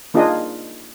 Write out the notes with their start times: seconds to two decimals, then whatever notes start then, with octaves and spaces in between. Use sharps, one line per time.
0.14 A#3 D4 D#4 F4 G#4 D#5